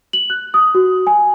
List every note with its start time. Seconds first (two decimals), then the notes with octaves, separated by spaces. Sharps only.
0.13 F#7
0.30 F#6
0.54 D#6
0.75 F#4
1.07 G#5